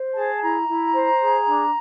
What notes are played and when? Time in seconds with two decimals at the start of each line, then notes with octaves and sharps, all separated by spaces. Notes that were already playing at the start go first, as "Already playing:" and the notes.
Already playing: C5
0.13 G#4 A5
0.40 E4 A#5
0.68 E4
0.94 C5
1.20 G#4
1.48 D4